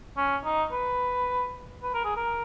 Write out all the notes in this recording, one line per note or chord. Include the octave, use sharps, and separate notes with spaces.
C#4
D#4
B4
B4
A#4
G#4
A#4